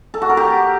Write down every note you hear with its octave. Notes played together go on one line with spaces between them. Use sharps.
A4
F#4
A#4
G4